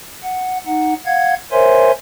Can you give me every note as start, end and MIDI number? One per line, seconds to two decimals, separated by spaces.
0.23 0.58 78
0.66 0.94 63
0.66 0.94 78
1.06 1.34 77
1.06 1.34 78
1.06 1.34 92
1.52 1.91 70
1.52 1.91 72
1.52 1.91 73
1.52 1.91 76
1.52 1.91 80
1.52 1.91 84